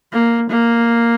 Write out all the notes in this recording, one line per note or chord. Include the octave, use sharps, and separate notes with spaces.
A#3
A#3